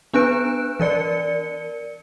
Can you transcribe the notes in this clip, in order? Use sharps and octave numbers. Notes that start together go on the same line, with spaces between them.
B3 D4 B4 F#6 D7
E3 A#4 D5 C#7